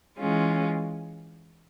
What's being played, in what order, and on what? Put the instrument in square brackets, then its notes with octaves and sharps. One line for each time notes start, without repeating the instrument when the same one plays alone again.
[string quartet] E3 G#3 C#4 F4